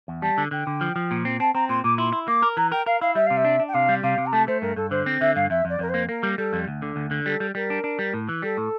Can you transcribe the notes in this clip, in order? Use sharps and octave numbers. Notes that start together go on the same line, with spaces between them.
E2
G3 A5
D3
D3 G5
D3
F3
F3
A#2
C4
C4 A5
C4 A#5
A#2 C6
A#2 D6
E4 C6
E4
A#3 D6
A#4
E3 A#5
A#4 G5
A#4 F5
E4 F5
G3 E5
C3 F5
E5
D4
D4
G5
C3 F5
G3
C3 F5
C3
A#5
A3 A5
A3 C5
G2 A#4
G2 A4
D3 C5
C4
D3 E5
G2 F5
F2 E5
F2 D5
F2 A#4
A#3 C5
A#3 A#4
G3
G3 A4
F2
D2
D3
D2
D3
G3 A4
G3
G3 A#4
D4
D4
G3
A2
E3
G3 A4
A2